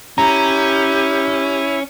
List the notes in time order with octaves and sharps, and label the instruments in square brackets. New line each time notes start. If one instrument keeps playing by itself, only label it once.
[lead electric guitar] C#4 [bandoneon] E4 [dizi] G4 [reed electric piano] A#5